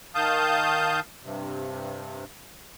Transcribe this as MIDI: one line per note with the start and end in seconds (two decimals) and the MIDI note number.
0.15 1.00 51
0.15 1.00 77
0.15 1.00 81
0.15 1.00 87
0.15 1.00 91
1.23 2.25 43
1.23 2.25 48